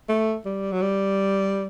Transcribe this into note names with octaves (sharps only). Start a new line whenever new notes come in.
A3
G3
F#3
G3